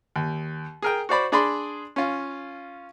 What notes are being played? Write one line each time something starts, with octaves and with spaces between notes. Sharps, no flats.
D#2
G#4 A#4 G5
F#4 C5 D5 B5
D4 G#4 D5 B5 C6
C#4 F4